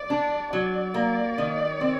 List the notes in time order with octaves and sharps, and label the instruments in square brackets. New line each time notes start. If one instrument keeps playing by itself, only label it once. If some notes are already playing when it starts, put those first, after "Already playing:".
Already playing: [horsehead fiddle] D5
[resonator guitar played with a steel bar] D4
[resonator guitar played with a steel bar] F#3 [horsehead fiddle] D5
[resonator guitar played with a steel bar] A#3
D#3
C4